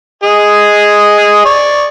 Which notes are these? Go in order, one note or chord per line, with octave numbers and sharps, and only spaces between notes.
G#4 D#5
D5 C#6